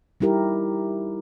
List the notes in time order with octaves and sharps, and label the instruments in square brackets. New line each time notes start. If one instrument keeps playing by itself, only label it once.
[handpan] G3 D#4 E4 G4 A#4